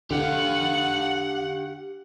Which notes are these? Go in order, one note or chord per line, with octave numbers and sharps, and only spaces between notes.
D3 G4 F5 F#5